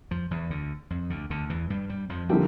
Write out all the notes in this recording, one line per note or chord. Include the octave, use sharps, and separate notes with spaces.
F2 F3
E2 E3
D2 D3
F2
D2 D3
D2 D3
E2 E3
G2 G3
G2 G3
F2 F3
D3 F3 G3 A#3 E4 G4